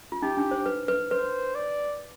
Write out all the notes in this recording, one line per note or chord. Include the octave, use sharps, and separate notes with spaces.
F4
D#4 G4
D4
C5
B4
B4
B4 C5
D5